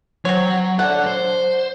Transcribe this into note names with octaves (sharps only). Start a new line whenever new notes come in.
F#3 C4 C#5
A4 D5 F#5
C5